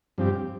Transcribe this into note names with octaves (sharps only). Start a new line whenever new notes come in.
G2 F3 C4 G4